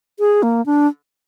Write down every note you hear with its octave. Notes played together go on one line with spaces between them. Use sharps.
G#4
A#3
D4